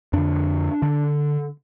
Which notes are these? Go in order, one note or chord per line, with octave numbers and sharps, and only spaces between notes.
F2 D3 D4
D3 D4